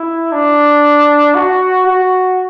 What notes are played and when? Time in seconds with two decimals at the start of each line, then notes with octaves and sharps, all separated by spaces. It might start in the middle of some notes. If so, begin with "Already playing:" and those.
Already playing: E4
0.32 D4
1.35 F#4
1.86 F#4